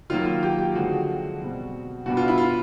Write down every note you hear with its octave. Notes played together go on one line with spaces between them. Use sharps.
D#3 F#3 A#3 F4
F4
G4
G4
D3 F3 G#3 F#4
B2 G3 C4
B2 G3 B3 D4 F#4
F4
E4
F4